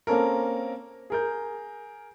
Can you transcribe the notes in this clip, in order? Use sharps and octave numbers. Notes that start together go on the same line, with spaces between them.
A#3 C4 C#4 A4 A#4
G#4 A#4 G6